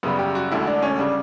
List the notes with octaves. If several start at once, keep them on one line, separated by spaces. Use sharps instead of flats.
F#2 C#3 G3 B3
G4
F#4
E1 D2 D3 E4
D4
C#4
C#3 G3 D4